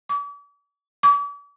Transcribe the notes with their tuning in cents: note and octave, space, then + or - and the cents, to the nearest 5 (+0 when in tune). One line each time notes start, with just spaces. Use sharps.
D6 -45
D6 -45